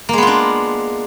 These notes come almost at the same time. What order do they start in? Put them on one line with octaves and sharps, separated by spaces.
A#3 G#3 B3 F4 D4